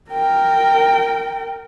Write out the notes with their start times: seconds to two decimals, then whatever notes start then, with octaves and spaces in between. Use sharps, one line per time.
0.11 A#4 G5